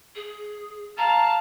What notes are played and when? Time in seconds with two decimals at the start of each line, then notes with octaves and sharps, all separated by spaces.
0.15 G#4
0.98 F5 A5 A#5